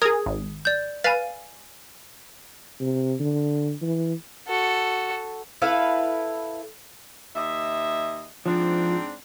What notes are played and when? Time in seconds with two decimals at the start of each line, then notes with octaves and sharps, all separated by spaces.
0.02 G#4 A#4 D#6 G#6
0.26 G#1
0.65 D5 G6
1.04 B4 F5 G#5 A6
2.80 C3
3.20 D3
3.82 E3
4.48 F#4 A4
5.62 E4 A4 B4 F5
7.35 D#2 D#5 E5
8.46 G#2 F3 C4 D4